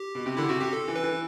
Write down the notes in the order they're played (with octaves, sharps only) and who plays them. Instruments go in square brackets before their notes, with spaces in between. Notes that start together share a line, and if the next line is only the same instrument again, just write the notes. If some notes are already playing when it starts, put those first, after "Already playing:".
Already playing: [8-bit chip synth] G4
[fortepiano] B2
C3
[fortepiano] D3 [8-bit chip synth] E4
[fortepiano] C3 [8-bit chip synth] F#4
[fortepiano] C3 [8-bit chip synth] G4
[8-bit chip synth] A4
[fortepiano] E3
[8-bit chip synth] B4
[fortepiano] E3